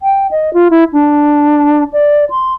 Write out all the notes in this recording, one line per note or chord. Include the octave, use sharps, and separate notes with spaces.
G5
D#5
F4
E4
D4
D5
C6